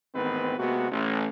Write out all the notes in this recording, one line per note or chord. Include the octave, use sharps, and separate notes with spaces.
A1 G#2 D#3 B3 C4 B4
C3 G#3 A#3 B3 F#4
A1